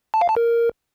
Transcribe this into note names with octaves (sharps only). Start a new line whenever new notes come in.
A5
F5
A5
A#4